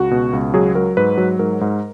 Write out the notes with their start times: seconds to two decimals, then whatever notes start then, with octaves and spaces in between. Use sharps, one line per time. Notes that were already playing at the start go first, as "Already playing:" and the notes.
Already playing: C#2 F#4
0.11 B2
0.33 C#2
0.54 F#3 G#4
0.75 F#3 A#4
0.97 G#2 B4
1.18 F#3
1.39 G#2 A#4
1.61 G#2